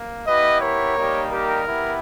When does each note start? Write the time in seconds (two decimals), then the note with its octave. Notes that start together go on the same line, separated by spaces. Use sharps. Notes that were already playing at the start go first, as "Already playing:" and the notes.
Already playing: A#3
0.26 B3 E4 G4 B4 D#5
0.62 A#4 C#5
0.97 G3 A#3 D#4 G4
1.31 G4 A#4
1.66 B3 E4 G4